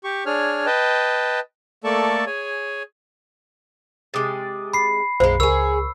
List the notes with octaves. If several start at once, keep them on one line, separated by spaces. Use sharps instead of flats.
G4 C#6
D4 G#4 C#5 F6
B4 D#5 G5 A5
A3 A#3 A4 D5 A5 C#6
G#4 C#5 G#5
C3 G#3 D6 D#6 A6
B5 C7
B1 F#2 G#3 A#3 C5
C#2 G#4 A#4 C#5 C#6 E6